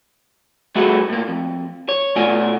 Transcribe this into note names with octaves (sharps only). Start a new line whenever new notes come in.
G3 A3 B3 E4 F#4 G#4
A2 A#3
F2
C#5
B2 A3 F4 D5 G#5